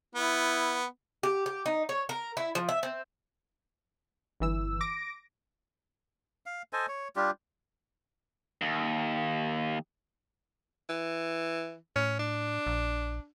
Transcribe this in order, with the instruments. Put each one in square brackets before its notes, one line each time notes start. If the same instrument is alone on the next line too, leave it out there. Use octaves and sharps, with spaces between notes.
[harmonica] B3 [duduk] E4
[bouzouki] G4
G4
D#4
C#5
A#4
E4
F3
E5
C4
[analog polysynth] G1 E3 E6
D6 A#6 D7
[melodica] F5
A4 C5 D#5 G#5
C#5
G3 D4 F4 G4
[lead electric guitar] D#2
[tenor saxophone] E3
[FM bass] A2 [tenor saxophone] C#4
[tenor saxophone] D4
[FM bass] A#1